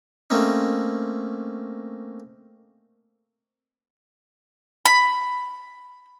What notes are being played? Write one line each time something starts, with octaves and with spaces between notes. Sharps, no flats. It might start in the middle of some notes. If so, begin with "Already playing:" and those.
A3 A#3 C4 C#4 D#4
B5